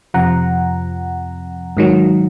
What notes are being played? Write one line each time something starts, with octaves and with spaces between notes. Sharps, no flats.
F2 C3 F3 F#5 A#5
G#2 D#3 F#3